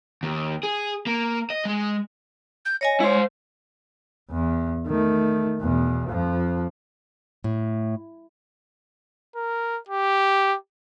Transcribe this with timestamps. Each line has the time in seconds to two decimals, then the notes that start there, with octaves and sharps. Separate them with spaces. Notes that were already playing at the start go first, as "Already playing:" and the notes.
0.23 D#2
0.63 G#4
1.07 A#3
1.50 D#5
1.65 G#3
2.65 G6
2.81 C#5 D#5 G#5 A#6
3.00 G#3 E4 C5 C#5
4.31 E2
4.87 D#3 A3
5.61 E2 B2
6.09 F2 F3
7.44 A2
9.36 A#4
9.89 G4